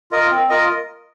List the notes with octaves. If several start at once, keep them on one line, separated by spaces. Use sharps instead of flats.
F4 A#4 D#5
C4
F4 A#4 D#5